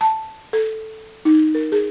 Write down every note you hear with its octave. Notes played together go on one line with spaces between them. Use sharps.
A5
A4
D#4
A#4
G#4